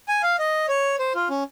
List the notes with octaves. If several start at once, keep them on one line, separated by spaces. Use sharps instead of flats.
G#5
F5
D#5
C#5
C5
F4
C#4